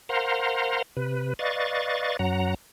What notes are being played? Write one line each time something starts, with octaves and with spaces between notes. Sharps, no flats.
A#4 C5 F5 F#5 A#5 C6
C3 B4
B4 D5 D#5 F5 C#6 A6
F#2 F#3 F#5 A#5